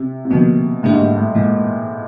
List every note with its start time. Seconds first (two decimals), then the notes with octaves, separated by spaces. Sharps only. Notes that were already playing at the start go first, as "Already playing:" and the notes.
Already playing: C3
0.25 C3
0.30 B2 D3 F3 A#3
0.83 A2 D3 G3 A#3 D4 G4
0.92 G#2
1.00 A2
1.17 A2
1.35 A#2 E3 G#3